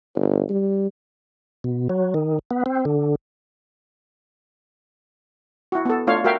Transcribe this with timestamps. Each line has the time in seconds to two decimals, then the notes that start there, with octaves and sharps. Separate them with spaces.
0.15 G1
0.50 G3
1.64 B2
1.89 F#3
2.14 D#3
2.51 B3
2.66 C4
2.85 D3
5.72 E4 F#4
5.85 B3 A4
6.07 A3 D4 F4 C#5 F5
6.24 F#4 A#4 E5 F5 G5